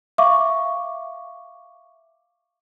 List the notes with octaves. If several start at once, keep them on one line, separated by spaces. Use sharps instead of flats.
E5 F5 C#6 D6